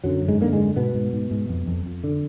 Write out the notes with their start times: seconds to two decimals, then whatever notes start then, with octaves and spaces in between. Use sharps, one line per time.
0.04 F#2 D3 F#3
0.22 F#2
0.28 G#2 G#3
0.40 D3 A#3
0.52 G#2 G#3
0.59 F#2
0.76 G#2 B2 B3
0.94 G#2
1.13 G#2
1.31 G#2
1.49 F2
1.67 F2
1.86 F2
2.04 D3